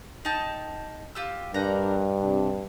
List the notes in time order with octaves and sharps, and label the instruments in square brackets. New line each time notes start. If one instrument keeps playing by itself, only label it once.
[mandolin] D#4 G5 A5
F4 G4 E6
[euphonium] G2 [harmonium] D4 A#4 [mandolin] D#4 F#5 A#5
[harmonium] C3 D4